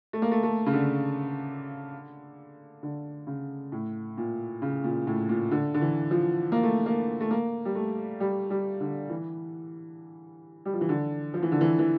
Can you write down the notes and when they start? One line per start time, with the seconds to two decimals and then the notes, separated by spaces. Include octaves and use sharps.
0.13 A3
0.22 A#3
0.32 A3
0.43 A3
0.66 C#3
0.73 D3
2.83 D3
3.27 C#3
3.72 A2
4.18 A#2
4.62 C#3
4.84 A#2
5.07 A2
5.29 A#2
5.51 D3
5.74 D3
5.82 E3
6.11 F3
6.52 A#3
6.63 A3
6.86 A#3
7.21 A3
7.31 A#3
7.65 G3
7.75 A3
8.20 G3
8.50 G3
8.80 D3
9.10 E3
10.66 G3
10.74 F3
10.81 E3
10.89 D3
11.34 F3
11.43 E3
11.52 D3
11.61 E3
11.79 E3